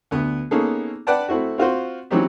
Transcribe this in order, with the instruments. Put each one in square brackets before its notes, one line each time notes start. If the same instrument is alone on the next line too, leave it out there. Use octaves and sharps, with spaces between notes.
[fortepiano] D2 B3
A#3 B3 C#4 D#4 G#4 A4
B4 D5 F#5 G5 A5
A3 C4 E4 F#4
C4 F4 F#4 C5
E3 F#3 C4 C#4 D#4 G4